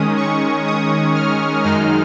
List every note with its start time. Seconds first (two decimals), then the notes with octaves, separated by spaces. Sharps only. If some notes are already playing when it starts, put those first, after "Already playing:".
Already playing: D#3 G#3 C#4 D#6
0.17 C#6
0.66 D#6
1.15 F6
1.64 F#2 D#3 G#3 D#4 F6